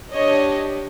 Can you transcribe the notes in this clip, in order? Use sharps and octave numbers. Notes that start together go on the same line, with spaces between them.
D4 G4 C#5 D#5